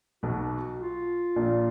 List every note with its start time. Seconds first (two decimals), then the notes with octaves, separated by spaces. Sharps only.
0.23 B1 B2 F#4
0.80 F4
1.36 A#1 A#2